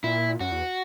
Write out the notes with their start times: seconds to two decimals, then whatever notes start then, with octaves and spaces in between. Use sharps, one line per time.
0.04 A#2 E4
0.40 F#2 F#4
0.52 E2